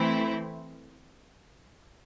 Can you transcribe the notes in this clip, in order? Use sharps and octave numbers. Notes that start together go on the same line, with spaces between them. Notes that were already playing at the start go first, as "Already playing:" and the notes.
Already playing: E3 A3 C4 E4